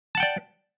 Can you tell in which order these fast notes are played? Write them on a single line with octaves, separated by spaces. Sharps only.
A5 F#5 G5 D5